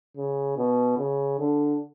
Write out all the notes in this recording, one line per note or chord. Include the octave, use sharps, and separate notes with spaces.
C#3
B2
C#3
D3